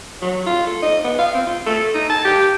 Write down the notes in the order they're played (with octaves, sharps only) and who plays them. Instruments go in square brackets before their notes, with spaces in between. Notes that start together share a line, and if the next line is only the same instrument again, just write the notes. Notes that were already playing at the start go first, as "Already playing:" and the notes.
[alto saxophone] F#3
F4
A4
D#5
B3
F5
C4
F4
A4
D#4
A5
G4